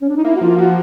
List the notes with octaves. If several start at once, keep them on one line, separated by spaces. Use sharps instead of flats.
C#4
D4
D#4
A#3 E4
F#4
F3 F4
F3 F#4